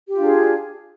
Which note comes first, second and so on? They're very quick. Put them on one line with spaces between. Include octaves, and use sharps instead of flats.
G4 F4 D4 G#4